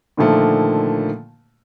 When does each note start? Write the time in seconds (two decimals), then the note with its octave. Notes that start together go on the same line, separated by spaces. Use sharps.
0.17 A#2 D3 D#3 F3 A3 A#3